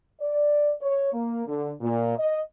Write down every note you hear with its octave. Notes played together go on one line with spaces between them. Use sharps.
D5
C#5
A#3
D3
A#2
D#5